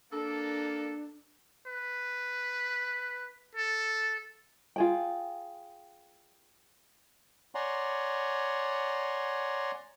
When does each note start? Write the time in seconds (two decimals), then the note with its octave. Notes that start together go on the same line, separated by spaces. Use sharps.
0.12 A#3 D4 A4
1.67 B4
3.55 A4
4.76 F4 G#4 G5
7.55 C#5 D5 F#5 G#5 A#5 C6